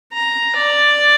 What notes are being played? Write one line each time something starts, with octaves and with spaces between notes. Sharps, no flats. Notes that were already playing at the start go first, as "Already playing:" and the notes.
A#5
D5